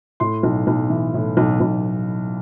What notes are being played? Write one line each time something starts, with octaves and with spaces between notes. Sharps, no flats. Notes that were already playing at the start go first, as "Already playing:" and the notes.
A2 C6
B1
B1
E3
A2
B1
B1